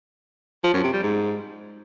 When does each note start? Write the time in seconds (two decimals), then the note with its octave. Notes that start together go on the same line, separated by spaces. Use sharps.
0.64 F3
0.74 F#2
0.83 C3
0.93 G3
1.03 G#2